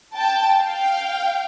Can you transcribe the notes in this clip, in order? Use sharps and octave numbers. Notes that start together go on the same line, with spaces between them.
G5 A5
F5 G5